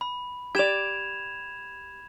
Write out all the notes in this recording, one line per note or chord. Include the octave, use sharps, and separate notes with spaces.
B5
G4 D5 G#6 E7 F7